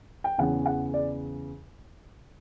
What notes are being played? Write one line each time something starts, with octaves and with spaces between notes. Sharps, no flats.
G5
E2 C#3 E3 F#5
F#5
D5